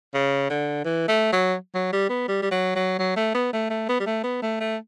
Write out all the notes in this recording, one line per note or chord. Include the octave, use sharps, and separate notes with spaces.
C#3
D3
E3
A3
F#3
F#3
G3
B3
G3
G3
F#3
F#3
F#3
A3
B3
A3
A3
B3
G3
A3
B3
A3
A3